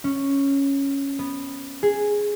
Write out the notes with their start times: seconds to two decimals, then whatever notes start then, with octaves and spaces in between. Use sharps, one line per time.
0.04 C#4
1.19 B3
1.83 G#4